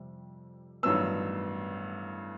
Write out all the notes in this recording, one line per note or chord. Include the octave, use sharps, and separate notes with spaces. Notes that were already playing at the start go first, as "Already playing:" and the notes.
Already playing: F2 C3 G3
A1 G2 D#3 F#3 B3 E6